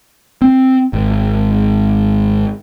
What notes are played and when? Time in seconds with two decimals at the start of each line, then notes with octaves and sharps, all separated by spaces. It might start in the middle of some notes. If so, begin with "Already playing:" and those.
0.42 C4
0.93 G#1